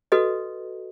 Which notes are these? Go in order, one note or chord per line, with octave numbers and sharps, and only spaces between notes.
F#4 A4 B4 D#5